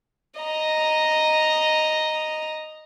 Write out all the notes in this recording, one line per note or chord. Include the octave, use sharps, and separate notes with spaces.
D#5 A#5